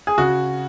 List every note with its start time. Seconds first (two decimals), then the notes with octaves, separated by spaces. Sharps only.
0.07 G#4
0.18 C#3 F#4